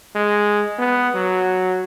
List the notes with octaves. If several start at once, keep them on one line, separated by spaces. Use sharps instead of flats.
G#3
B3
F#3